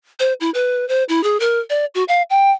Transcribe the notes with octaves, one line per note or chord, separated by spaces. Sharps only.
C5
E4
B4
C5
E4
G#4
A#4
D5
F#4
F5
G5